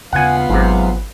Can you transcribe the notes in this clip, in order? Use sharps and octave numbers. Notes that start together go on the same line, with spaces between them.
D#2 C#3 B3 F4 F5 F#5 G#5
G#1 G#2 C3 F#3